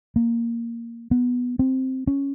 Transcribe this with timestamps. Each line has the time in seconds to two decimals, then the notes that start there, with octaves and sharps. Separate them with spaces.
0.16 A#3
1.11 B3
1.59 C4
2.07 C#4